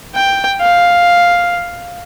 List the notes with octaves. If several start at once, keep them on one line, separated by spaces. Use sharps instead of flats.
G5
F5